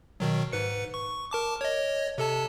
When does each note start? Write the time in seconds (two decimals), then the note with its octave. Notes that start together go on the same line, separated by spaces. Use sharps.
0.20 B2 D#3 F#3
0.53 G#2 B4 C#7
0.94 C#6
1.31 A#4 A5 D6
1.61 C#5 D#5
2.18 C3 A4 A5